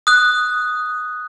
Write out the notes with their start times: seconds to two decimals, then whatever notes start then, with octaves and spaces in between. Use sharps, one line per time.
0.07 D#6 F#6